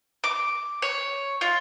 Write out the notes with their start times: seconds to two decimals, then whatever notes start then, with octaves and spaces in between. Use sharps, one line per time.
0.24 D6
0.82 C#5
1.41 F4